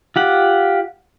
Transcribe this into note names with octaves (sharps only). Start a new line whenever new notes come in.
F4 G4 F#5